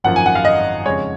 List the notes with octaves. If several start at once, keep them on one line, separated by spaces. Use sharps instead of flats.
G#1 F#2 F3 A#3 F#5
G#5
F#5
F5
D#5
F2 C#3 G#3 C#5